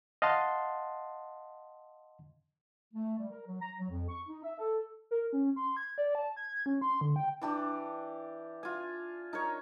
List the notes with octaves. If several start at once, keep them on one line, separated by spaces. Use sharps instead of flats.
D#5 F5 F#5 A5 C6
A3
G3
A#4
F#3
A#5
F#3
F2
C#6
D#4
E5
A4
A#4
C#4
C6
G#6
D5
A5
G#6
C#4
C6
D3
G5
E3 D4 G4
F4 G#5
D#4 A#4 C#5